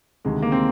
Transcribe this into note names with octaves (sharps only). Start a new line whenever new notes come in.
D2 C3 D#3 G#3
A#3
C4